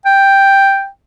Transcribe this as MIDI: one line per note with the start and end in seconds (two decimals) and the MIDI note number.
0.06 0.88 79